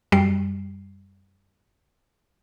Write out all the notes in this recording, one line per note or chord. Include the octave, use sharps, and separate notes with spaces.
F#2 G3 C7